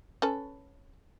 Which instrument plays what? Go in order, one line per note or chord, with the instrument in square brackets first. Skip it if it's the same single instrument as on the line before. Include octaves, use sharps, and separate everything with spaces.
[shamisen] C#4 A4 B4